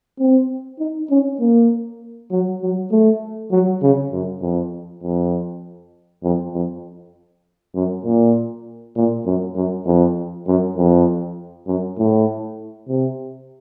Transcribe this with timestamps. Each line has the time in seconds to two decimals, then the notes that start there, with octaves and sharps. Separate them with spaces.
0.19 C4
0.79 D#4
1.10 C#4
1.40 A#3
2.31 F#3
2.61 F#3
2.91 A3
3.51 F#3
3.82 C#3
4.12 F#2
4.42 F2
5.03 F2
6.23 F2
6.54 F2
7.75 F#2
8.05 A#2
8.96 A#2
9.26 F#2
9.55 F#2
9.86 F2
10.47 F#2
10.77 F2
11.67 F#2
11.98 A2
12.88 C3